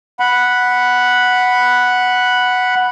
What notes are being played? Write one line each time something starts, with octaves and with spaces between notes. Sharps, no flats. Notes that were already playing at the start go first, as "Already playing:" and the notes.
F#5 B5